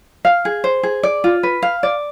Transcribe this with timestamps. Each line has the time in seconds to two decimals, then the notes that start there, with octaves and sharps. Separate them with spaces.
0.25 F5
0.45 G#4
0.64 C5
0.83 G#4
1.03 D5
1.24 F4
1.43 B4
1.62 F5
1.83 D5